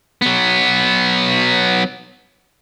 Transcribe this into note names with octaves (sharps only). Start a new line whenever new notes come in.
F#3 B3